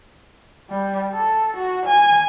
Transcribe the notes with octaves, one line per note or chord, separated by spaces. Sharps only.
G3
A4
F#4
G#5